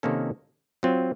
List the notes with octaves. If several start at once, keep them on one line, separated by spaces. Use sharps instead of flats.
C3 D#3 A#3 C#4 A4
F#3 C4 F4